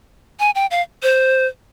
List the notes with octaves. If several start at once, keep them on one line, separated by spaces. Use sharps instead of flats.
G#5
G5
F5
C5